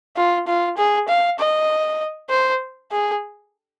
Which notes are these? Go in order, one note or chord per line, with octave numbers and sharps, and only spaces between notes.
F4
F4
G#4
F5
D#5
C5
G#4